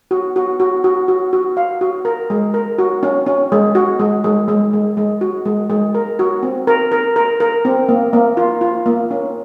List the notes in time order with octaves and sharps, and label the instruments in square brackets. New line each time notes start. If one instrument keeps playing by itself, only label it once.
[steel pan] F#4
F#4
F#4
F#4
F#4
F#4
F5
F#4
A#4
G#3
A#4
F#4
C#4
C#4
G#3
F#4
G#3
G#3
G#3
G#3
G#3
F#4
G#3
G#3
A#4
F#4
C4
A#4
A#4
A#4
A#4
C4
A#3
A#3
F4
F4
A#3
C#4